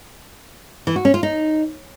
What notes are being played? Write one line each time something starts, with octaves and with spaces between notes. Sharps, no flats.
E3
F#4
C#4
F4
D#4